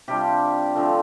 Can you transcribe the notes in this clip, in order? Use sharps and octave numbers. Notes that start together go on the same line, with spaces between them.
C3 G3 D4 F4 G4
D3 F3 A3 C4